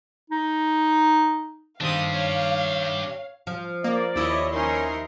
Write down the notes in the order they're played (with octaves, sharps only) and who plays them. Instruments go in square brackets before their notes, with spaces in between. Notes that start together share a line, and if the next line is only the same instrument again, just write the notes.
[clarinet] D#4
[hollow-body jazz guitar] G2 D#3 [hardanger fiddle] C4 D#6 [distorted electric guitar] D4 G4 [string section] F5
[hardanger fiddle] C#5
[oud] F3
[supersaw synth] A#3 [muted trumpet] D5
[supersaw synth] D#2 E4 [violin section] C#5 D#5
[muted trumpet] C#4 [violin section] D#4 A#4 C6